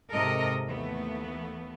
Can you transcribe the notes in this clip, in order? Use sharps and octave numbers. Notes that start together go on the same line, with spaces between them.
G#2 C3 A4 A#4 D#5
D#2 E3 A3 B3